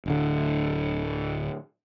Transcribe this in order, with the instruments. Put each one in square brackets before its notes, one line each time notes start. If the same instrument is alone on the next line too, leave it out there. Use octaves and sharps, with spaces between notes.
[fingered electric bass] D1 D3